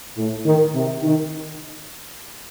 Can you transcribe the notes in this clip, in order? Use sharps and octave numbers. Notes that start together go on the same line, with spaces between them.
A2
D#3
C3
D#3